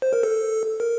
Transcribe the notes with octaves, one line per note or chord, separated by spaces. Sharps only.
C5
A#4
A4
A#4